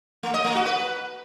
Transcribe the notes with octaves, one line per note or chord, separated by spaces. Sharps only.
A3
D#5
A3
F#4
B4